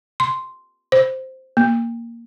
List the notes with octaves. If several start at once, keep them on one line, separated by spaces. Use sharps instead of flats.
C6
C5
A#3